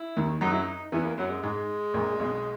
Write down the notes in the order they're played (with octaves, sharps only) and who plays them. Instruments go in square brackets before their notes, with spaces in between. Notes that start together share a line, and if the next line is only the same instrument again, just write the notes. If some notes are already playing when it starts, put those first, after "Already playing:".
Already playing: [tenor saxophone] E4
[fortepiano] D#2 D#3
[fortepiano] F#2 F#3 [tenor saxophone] D#4
[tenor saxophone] E4
D#4
[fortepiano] E2 E3 [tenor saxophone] B3
[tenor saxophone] A#3
[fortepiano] F#2 [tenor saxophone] F#3
[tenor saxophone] G#3
[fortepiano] G#2 [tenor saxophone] G#3
[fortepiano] A#1 A#2
B1 B2